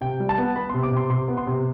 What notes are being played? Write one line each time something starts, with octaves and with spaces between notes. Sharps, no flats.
C3 G5
G3
A5
B3
B3 B5
C6
C3
D6
C3 C6
C3 C6
B3
C6
C3